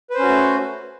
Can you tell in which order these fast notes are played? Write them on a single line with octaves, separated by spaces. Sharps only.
B4 C5 C#4 F#4 A3